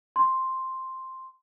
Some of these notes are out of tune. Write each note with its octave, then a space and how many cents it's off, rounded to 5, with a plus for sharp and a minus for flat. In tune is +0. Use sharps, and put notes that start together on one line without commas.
C6 +0